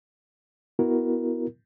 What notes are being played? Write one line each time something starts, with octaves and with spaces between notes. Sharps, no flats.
B3 E4 F#4 A#4